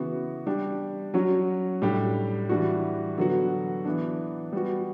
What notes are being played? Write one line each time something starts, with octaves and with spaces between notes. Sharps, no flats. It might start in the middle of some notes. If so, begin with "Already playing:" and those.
Already playing: C#3 E3 B3 F#4
G3 D4 G4
F#3 C#4 F#4
A2 G3 D4 G4
E3 G3 D4 F#4
D3 F#3 B3 F#4
E3 B3 D4
G3 B3 F#4